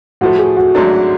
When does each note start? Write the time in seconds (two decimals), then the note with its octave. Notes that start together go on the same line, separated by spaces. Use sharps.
0.21 A2 F3 A3 F#4
0.39 G#4
0.57 F#4
0.75 G#1 G#2 F#3 A3 D4